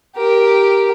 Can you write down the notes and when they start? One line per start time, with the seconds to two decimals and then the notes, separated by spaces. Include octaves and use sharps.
0.17 G4 A#4